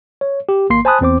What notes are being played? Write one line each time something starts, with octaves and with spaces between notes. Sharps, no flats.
C#5
G4
G#1 A#3 C6 C7
C5 G#5 A5 B5 D#6 F#6
E2 C4 C5 D6